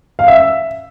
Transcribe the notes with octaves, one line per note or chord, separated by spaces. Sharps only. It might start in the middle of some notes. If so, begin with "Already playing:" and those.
F5
E5